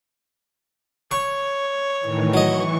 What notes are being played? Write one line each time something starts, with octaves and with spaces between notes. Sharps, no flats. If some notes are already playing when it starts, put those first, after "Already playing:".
C#5 C#6
A2 D#3 E3
E3 F#3 D#5 C#6